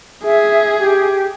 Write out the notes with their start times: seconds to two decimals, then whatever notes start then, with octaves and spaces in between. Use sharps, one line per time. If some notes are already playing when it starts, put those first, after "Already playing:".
0.25 G#4 E5
0.79 G4